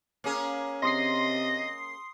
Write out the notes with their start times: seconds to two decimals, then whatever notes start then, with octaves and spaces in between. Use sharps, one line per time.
0.24 A#3 C#4 G#4
0.83 C3 D#5 C6 D#6 C7